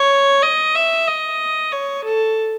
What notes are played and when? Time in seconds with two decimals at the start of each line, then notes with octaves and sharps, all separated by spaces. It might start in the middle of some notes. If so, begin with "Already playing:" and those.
Already playing: C#5
0.42 D#5
0.75 E5
1.08 D#5
1.72 C#5
2.05 A4